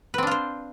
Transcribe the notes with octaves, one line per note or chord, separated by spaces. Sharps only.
C4 D4 F4 B4 C5